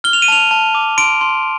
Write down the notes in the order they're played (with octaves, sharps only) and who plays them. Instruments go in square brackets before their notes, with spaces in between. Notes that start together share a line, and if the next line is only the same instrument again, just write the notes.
[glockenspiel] F6 G7
F7
D#7
A5 F7
A5
D6
C6 D7
C6